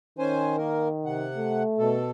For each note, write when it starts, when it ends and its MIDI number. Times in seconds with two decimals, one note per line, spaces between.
0.19 1.29 51
0.19 0.56 61
0.19 0.56 72
0.19 0.56 80
0.57 0.88 58
0.57 0.88 70
1.05 1.63 48
1.05 1.63 78
1.37 2.00 57
1.78 2.11 47
1.78 2.11 69